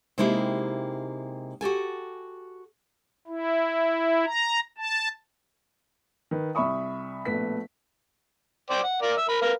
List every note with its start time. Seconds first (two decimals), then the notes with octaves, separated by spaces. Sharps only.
0.18 C3 G#3 A#3 D#4 E4 G4
1.61 F#4 G4 A4 G#5
3.28 E4
4.25 A#5
4.78 A5
6.31 D#3 B4
6.55 C2 E5 B5 C#6 D#6
7.25 A#1 B2 A3 B4 B6
8.70 C5 D5 G5
8.83 F#5
9.02 A#4 D5 F5
9.17 E5
9.29 A#4 B5
9.41 A#4 B4 F5